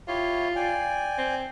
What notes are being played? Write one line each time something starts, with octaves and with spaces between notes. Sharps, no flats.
E4 F4 G4 C#5
D5 G5 G#5
C4